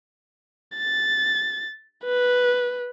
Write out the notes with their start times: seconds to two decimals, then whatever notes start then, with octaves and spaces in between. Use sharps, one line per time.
0.78 A6
2.05 B4